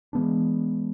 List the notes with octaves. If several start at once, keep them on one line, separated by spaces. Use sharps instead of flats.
E3 G#3 B3 D4